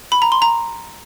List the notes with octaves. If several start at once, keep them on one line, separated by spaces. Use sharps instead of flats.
B5
A#5
C6
A#5